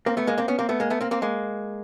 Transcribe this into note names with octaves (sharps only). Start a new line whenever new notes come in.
A#3 C4
A3 B3
G#3 A#3
A#3 C4
B3 C#4
A#3 C4
A3 B3
G#3 A#3
A3 B3
A#3 C4
A#3 C4
G#3 A#3